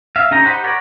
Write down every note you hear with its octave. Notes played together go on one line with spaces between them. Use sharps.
E5 F5
D3 C#4 D#4 G4 A#5
D#4 G4 C5 F#5 B5
A#4 C#5 D5 F#5 B5